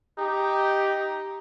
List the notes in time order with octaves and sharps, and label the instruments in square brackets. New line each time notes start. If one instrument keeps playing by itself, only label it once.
[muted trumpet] D#4 [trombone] G4